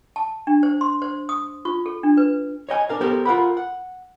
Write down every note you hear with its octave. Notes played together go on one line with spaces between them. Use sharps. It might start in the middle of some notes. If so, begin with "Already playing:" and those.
A5
D4
C5
C6
C5
D#6
F4
A4
D4
B4
C#5 D#5 G5 G#5
D4 A#4 F5
B3 G4 A4 A#4 C5
F4 A#4 F#5 B5
F#5